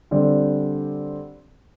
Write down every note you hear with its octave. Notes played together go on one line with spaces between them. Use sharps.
D3 G3 C4 D5